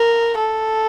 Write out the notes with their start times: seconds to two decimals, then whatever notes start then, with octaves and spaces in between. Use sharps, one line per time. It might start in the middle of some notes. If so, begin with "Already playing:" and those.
Already playing: A#4
0.38 A4